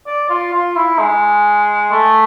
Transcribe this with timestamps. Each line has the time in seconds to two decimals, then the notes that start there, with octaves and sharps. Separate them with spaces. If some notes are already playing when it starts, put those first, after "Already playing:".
0.07 D5
0.30 F4
0.53 F4
0.76 E4
0.99 G#3
1.92 A3